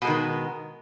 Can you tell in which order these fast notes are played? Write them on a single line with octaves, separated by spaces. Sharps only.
B2 G#3 D#3 B3